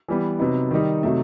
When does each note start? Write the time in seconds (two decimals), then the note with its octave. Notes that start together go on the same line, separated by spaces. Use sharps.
0.08 E3 G3 B3
0.39 C3 F#3 B3 D#4
0.71 D#3 G3 D#4
1.03 C3 F#3 A3 D#4 E5